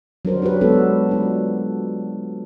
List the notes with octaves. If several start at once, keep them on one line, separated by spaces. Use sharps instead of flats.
F#3 D4 A#4 C5
D4 F#4 G4 B4
G#3 B3 D4 F#4 A4
A3 D4 F4